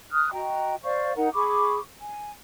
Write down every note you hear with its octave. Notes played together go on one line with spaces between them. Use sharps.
D#6 F6 F#6
F#4 D#5 G5 A#5
C5 D5 F5 C#6
D#4 A#4 F#5 A#5
G#4 B5 C#6 D6
G#5